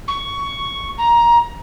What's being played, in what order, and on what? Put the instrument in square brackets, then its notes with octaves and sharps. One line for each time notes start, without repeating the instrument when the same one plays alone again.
[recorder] C#6
A#5